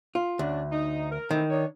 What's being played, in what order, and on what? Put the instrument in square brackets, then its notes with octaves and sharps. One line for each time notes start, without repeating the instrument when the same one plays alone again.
[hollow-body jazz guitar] F4
[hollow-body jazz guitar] D2 [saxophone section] C#4 D4
[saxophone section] D#4
A#4
[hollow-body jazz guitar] D#3 [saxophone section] E3 A3 C4
[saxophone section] D4 D#4 C#5